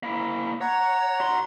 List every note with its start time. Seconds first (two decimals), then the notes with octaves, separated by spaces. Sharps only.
0.03 A#3 E4
0.61 C#5 F#5 A#5
1.20 F#4 C6